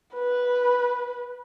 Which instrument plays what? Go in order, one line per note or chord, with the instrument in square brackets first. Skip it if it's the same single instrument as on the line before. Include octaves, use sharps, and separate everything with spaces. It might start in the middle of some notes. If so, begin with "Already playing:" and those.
[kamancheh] B4